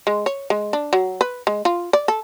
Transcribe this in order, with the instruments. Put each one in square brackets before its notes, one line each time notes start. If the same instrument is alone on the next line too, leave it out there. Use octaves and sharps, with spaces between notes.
[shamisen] G#3
C#5
G#3
D4
F#3
B4
G#3
F4
D5
A4